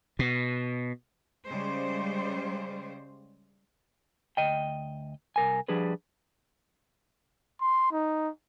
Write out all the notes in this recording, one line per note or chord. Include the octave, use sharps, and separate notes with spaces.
B2
C#3 G3 G#3 C5
D2 D#5 G5
C2 A#4 G#5
F3 G3 D4 G#4 B4
C6
D#4